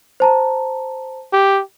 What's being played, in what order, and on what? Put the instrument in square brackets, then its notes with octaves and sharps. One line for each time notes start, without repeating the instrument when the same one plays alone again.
[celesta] C5 A5 A#5
[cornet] G4